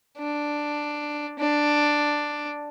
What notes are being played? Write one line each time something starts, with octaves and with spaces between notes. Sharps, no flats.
D4
D4